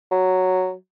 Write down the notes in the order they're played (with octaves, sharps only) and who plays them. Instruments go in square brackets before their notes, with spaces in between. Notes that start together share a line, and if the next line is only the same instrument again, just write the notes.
[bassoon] F#3